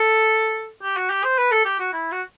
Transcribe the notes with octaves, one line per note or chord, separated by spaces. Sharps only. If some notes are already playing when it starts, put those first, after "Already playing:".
Already playing: A4
G4
F#4
G4
C5
B4
A4
G4
F#4
E4
F#4